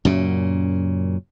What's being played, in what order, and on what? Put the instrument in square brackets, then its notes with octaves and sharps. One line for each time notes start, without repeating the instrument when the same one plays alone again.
[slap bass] F#2 A#2 C#3